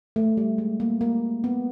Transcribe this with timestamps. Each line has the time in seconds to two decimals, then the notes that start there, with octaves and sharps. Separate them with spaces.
0.16 A3
0.37 G3
0.58 G#3
0.80 A#3
1.01 A#3
1.44 B3